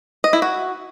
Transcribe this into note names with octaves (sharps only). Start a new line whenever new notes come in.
D#5
E4
F#4